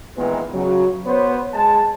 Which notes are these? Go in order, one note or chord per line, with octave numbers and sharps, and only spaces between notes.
A#2 D#3 E3 G#3 B3
C#3 F#3
B3 C5 C#5
G#3 A5